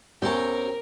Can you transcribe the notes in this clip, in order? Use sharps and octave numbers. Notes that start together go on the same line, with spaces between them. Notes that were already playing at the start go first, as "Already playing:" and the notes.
E2 C4 C#4 G4 A#4 C6